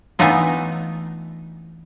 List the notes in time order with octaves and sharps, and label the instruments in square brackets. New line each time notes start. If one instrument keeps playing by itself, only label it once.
[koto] E3 A3 B3 D4 D#4 F4